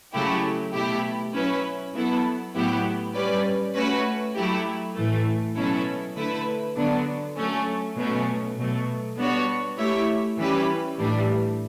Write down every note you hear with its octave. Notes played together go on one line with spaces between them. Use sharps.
C#3 F#3 A3 E4 G4
B2 A3 E4 G4
F#3 C#4 E4 B4
F#3 B3 E4 A4
A2 F#3 B3 E4 G4
G3 C#4 G4 B4 D5
A3 C#4 F#4 B4
F#3 A3 E4 G4
A2 E3 A3
B2 F#3 C#4 E4 A4
D3 A3 E4 B4
D3 F#3 B3 D4
F#3 A3 C#4
B2 F#3 A3 C#4
B2 F#3 A3
G3 B3 D4 F#4 C#5
A3 E4 G4 C#5 E5
E3 G3 C#4 G4 B4
A2 E3 G3 D4